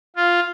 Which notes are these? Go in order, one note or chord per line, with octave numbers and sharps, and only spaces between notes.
F4